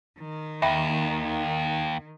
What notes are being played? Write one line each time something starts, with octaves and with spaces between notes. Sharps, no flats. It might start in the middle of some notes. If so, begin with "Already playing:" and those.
D#3
D#2 E5 G5 B5